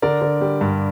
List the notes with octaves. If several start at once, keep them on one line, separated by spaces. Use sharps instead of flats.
D3 A#4 D5
D3
G3
G2